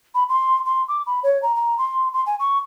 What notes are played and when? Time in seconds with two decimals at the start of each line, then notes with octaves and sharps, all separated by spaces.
0.15 B5
0.29 C6
0.65 C6
0.88 D6
1.07 B5
1.23 C#5
1.42 A#5
1.55 A#5
1.78 C6
2.13 C6
2.26 G#5
2.40 C#6